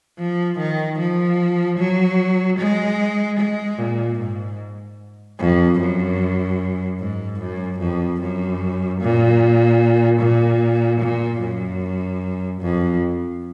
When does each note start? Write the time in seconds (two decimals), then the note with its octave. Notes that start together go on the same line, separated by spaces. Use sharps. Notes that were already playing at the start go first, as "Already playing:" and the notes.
0.18 F3
0.59 D#3
0.99 F3
1.78 F#3
2.59 G#3
3.39 G#3
3.78 A#2
4.19 G#2
5.39 F2
5.79 F#2
7.00 G#2
7.40 F#2
7.79 F2
8.20 F#2
9.01 A#2
10.20 A#2
11.00 A#2
11.41 F#2
12.61 F2